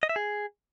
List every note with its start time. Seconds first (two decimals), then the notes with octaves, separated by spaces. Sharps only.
0.03 D#5
0.09 E5
0.16 G#4